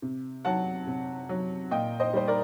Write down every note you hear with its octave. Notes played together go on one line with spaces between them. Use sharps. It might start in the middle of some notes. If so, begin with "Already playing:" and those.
C3
F#3 F#5 A5
C3
F#3
A#2 D#5 G5
C5 D#5
G3 C5
A#4 D5